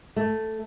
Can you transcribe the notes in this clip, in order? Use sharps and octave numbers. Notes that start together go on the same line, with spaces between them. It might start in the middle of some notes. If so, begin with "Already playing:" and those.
A3